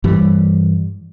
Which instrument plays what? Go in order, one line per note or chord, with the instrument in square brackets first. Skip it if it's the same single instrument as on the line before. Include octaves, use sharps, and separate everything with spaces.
[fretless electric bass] G2 E3 G3